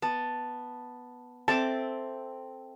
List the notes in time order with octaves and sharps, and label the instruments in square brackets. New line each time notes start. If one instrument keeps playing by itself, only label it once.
[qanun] B3 [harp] A5
[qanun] C4 D6 [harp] A4 E5 [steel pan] A5